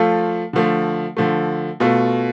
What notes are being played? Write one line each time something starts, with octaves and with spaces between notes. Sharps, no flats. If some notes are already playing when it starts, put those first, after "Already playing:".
Already playing: F3 A3 F4 A4
D3 F3 A3
D3 F3 A3
B2 A3 F4 A4